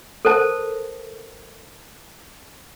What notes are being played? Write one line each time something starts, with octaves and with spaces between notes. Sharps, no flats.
A4 A#4 C5 A5